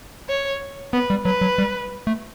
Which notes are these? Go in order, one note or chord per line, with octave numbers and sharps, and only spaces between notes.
C#5
B3 B4
G3
F#3 B4
F#3
G3
A3